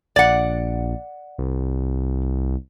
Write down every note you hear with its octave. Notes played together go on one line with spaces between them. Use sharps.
A#1 D5 F#5
C2